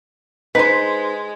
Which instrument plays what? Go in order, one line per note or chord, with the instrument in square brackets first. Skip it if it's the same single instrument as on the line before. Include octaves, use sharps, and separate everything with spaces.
[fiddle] G#3 [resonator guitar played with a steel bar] D#4 C5 [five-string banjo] B4 [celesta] B6